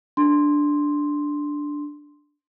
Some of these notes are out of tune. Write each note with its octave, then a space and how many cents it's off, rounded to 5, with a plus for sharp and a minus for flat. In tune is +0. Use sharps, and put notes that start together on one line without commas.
D4 +0 C6 +0